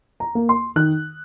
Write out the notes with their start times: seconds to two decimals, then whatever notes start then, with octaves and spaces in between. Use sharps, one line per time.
0.20 A#5
0.35 A#3
0.49 C6
0.76 D#3 F#6